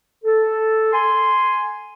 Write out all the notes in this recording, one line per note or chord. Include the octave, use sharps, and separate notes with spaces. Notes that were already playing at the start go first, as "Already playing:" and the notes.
A4
G#5 C6